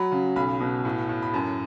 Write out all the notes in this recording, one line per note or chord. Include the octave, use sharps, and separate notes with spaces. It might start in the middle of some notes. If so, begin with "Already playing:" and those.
Already playing: F#3 B5
C#3
B1 B5
B2
A2
A2
B5
F#2 A5